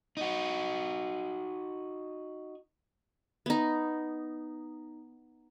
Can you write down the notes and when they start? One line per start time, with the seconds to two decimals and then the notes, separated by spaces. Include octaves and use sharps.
0.17 D#4 F#4
3.46 B3 D#4